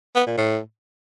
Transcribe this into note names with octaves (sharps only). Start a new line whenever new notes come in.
B3
A#2
A2